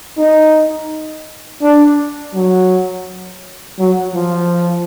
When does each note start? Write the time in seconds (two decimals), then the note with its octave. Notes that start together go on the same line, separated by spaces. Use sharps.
0.18 D#4
1.62 D4
2.35 F#3
3.79 F#3
4.15 F3